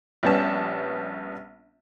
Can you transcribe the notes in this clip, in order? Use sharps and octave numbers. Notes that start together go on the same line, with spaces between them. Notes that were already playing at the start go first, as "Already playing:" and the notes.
A#1 G3 B3 C#4 A5